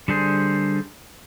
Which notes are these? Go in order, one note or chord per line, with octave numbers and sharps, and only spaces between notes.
D3 G3 D4 G#4 C5